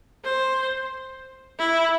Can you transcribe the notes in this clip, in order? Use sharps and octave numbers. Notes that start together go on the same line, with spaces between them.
C5
E4